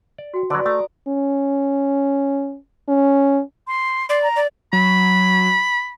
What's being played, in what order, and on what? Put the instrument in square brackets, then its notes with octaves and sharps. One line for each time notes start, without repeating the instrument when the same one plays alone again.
[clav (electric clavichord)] D5
[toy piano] F#4 G5
[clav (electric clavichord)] D3 F#3 [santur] B4 D5 [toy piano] D#5 C6
[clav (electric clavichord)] A3 [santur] A#5 [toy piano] D#6
[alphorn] C#4
C#4
[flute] C6
[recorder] D5 [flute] C6
[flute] A#5
[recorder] D5
[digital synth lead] F#3 [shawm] B5